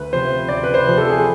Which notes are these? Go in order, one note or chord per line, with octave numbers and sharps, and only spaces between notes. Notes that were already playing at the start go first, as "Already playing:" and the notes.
Already playing: D2 B4
C3 F3 C5
D2 D5
B4
C5
C3 F3
A4
G#4